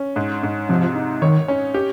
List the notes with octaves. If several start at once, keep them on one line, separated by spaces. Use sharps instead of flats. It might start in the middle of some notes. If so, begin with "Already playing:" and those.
Already playing: C#4
G#2
G#2
C3 F3
D#4
D#3 C#5
C#4
G4